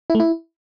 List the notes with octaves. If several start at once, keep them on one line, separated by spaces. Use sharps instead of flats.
E4
A3
E4